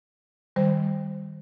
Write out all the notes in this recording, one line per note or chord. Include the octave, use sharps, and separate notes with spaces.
D#3 G3 C5